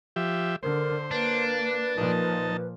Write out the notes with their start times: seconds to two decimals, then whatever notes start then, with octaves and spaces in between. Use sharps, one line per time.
0.16 F3 G4 E5
0.63 D3 A#4 C5
1.11 A#3 D4 B4
1.98 A#2 F3 D#4 A5